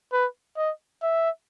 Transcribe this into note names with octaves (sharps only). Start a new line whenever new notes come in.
B4
D#5
E5